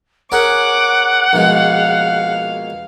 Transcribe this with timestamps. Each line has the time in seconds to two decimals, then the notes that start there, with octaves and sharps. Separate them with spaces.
0.32 C#4 G#4 A#4 F#5 D6
1.33 A#1 B2 G#3 F5